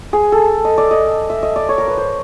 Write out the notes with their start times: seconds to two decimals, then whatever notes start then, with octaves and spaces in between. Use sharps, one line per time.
0.13 G#4
0.32 A4
0.65 D#5
0.78 D5
0.91 D#5
1.30 E5
1.43 D#5
1.56 D5
1.69 C#5
1.78 A#4
1.88 B4
1.98 C5